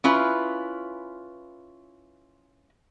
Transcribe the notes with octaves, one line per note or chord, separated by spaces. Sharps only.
C#4 E4 F4 B4